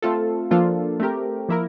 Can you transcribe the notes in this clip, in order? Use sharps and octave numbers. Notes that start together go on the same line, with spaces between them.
A3 C4 F4 A4
F3 A#3 D4 F4 A4
A3 C4 G4 A#4
F3 A#3 E4 A#4